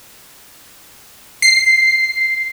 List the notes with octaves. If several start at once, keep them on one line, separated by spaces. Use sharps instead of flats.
C7